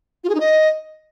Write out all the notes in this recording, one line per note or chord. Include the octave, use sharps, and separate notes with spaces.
F4
G#4
D#4
D#5